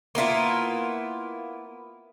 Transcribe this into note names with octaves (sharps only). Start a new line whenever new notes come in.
A#3 B3 E4 F4